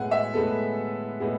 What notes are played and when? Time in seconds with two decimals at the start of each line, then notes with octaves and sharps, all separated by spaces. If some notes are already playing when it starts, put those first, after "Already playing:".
Already playing: A2 G#3 B3 F#5 G#5
0.11 E5
0.34 A2 G#3 B3 A4
1.20 A2 G#3 B3